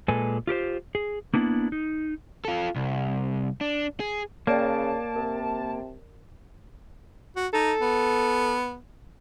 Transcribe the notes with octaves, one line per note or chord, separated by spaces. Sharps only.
A#2 G#3 A4 B4 G#5
F4 G4 A#4 C5
G#4
A#3 B3 D4 E4
D#4
F4 A4
C2
D4
G#4
C#3 A#3 C#5 D5 G5 A5
C3 A#4
F#4
D#4 A4
B3